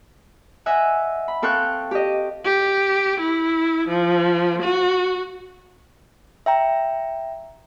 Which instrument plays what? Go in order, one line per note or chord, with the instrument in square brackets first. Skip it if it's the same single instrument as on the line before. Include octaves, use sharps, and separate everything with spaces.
[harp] D#5 E5 F#5 G#5
B5
C4 A4 F5 G5 C#6 F#6
G4 D#5
[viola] G4
E4
F3
F#4
[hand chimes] E5 G5 A#5